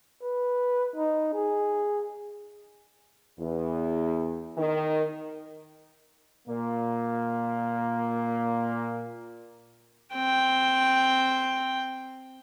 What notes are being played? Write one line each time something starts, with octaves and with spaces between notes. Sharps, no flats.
B4
D#4
G#4
E2
D#3
A#2 A#3
C4 G5